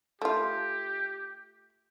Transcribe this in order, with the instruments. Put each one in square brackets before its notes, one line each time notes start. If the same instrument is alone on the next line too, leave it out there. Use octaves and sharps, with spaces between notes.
[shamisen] A3 F4 [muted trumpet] G4